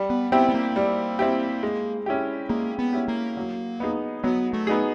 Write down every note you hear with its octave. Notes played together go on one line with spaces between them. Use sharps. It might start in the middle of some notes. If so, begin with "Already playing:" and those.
Already playing: G3
B3
B3 C4 E4 G4
B3
A#3
G3
C4 E4 G4
G#3
C#4 E4 G4
G#3 A#3
B3
C#4 E4 G4
A#3
F#3
B3 D#4 G#4
F#3 B3
A3
B3 D#4 G#4